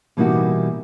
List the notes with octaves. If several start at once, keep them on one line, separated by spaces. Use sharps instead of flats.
B2 E3 G3 A#3 D#4 F#4